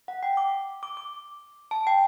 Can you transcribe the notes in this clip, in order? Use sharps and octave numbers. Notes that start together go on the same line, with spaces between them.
F#5
G5
D6
D6
D6
A5
G5